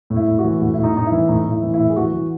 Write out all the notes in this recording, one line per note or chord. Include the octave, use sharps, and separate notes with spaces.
A2
E4
A2
F#4
E3
A2 F#4
A2 E4
D#4
A2 D#4
E4
E3
A2 D#4
A2
E4
E3
E4
A2
G#4
E3 F#4
E3